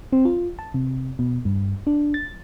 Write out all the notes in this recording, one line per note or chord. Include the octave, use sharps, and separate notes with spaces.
C4
F4
A5
C3
B2
G2
D4
A6